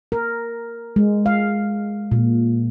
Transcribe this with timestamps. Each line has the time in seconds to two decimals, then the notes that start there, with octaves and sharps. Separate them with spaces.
0.12 A#4
0.96 G#3
1.26 F5
2.12 A#2